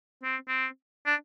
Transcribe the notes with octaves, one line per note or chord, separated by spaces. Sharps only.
C4
C4
D4